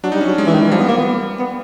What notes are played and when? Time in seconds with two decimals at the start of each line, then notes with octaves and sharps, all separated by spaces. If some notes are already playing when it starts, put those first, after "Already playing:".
0.03 F#3 D4
0.12 G3 D#4
0.21 C#4
0.27 F#3 D4
0.38 G#3
0.47 E3
0.54 D#3
0.63 E3
0.72 F3 G3
0.80 B3
0.88 A#3
0.98 B3
1.39 B3